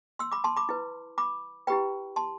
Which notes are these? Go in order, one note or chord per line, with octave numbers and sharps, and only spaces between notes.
C6 E6
B5 D6
A5 C6
B5 D6
E4 B4
B5 D6
E4 G4 B4 G5 B5
A5 C6